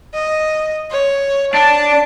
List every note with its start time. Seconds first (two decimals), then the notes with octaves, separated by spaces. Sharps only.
0.14 D#5
0.91 C#5
1.54 D4 A5